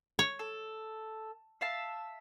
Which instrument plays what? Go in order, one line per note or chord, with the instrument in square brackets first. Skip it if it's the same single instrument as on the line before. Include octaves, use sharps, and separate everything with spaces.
[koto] C#5
[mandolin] A4
E5 F5 A5